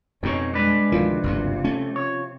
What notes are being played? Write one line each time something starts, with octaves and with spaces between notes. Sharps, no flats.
F2 B2 C4 C#4 D#4 C#5
G3 G#3 D4 B4
D2 C3 D#3 F3
F#1 D2 G2
A3 C#4
C#5